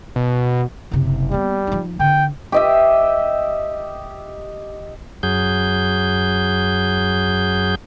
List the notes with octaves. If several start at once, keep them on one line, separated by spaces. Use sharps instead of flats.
B2
F#1 C3
G3 A#3 B3
F3 D#4
D3 G5
G4 D#5 E5
F#2 F#3 G#4 G6